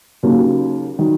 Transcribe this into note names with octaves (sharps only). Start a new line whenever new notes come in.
D#2 C#3 F#3 A#3
D#3 F#3